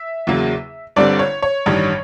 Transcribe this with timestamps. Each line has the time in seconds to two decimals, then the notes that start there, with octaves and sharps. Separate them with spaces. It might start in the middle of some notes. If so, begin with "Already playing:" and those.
Already playing: E5
0.27 E2 C#3 F#3 A#3
0.96 G1 G2 D3 G3 C4 D5
1.19 C#5
1.42 C#5
1.66 A1 G2 D#3 G3